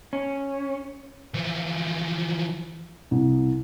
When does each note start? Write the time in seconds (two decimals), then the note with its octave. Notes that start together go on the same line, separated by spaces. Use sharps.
0.13 C#4
1.34 E3 F3
3.11 C2